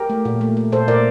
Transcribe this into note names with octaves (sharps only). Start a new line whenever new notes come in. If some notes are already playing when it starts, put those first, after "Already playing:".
Already playing: G4 A#4
A3
A#2
A3
A3
A#2 A4 C5
A#2 A#4 D5